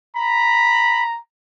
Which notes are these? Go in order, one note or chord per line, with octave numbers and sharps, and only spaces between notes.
A#5 B5